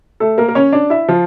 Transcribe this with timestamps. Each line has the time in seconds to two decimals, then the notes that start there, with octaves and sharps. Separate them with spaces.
0.20 A3 A4
0.38 A#3 A#4
0.49 A#4
0.55 C#4 C#5
0.73 D4 D5
0.90 E4 E5
1.09 F3 F4